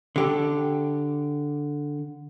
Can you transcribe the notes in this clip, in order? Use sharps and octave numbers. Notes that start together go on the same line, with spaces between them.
D3 G4 A4